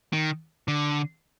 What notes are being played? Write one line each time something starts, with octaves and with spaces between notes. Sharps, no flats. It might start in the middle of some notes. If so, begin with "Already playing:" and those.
D#3
D3